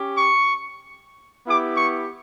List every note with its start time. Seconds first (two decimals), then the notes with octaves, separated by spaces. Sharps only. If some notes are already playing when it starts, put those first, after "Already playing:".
Already playing: C#4 G4
0.14 C#6
1.47 B3 E4 G4 D6
1.77 C#6